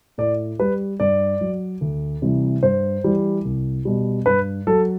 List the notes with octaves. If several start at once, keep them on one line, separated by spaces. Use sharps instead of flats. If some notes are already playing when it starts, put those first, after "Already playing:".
A2 D5
G3 B4
G2 D5
F#3
D2
C3 E3 G3
G2 C5
E3 G3
C2
B2 G3
G2 B4
F#3 A4